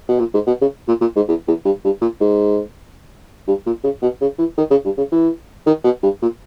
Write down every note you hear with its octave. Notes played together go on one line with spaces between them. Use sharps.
B2
A#2
G#2
B2
C#3
A#2
A#2
G#2
E2
E2
G2
G2
A#2
G#2
G2
A#2
C#3
B2
C#3
E3
D#3
C#3
G2
C#3
E3
D#3
B2
G2
A#2